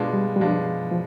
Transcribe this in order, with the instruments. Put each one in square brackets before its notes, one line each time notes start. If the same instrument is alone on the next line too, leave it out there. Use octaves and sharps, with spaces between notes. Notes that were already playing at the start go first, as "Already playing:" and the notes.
Already playing: [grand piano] B2 G#3 D4 F4
[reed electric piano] G3
G3
[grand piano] B2 G#3 D4 F4 [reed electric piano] F3
[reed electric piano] F3